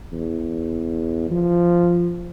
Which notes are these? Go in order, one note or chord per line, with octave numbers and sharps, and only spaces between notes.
E2
F3